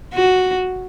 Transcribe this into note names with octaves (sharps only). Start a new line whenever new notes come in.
F#4